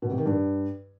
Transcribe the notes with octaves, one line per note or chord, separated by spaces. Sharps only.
B2
C3
D#3
G2